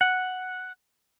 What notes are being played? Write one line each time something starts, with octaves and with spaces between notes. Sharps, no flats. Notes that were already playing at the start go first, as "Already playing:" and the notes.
F#5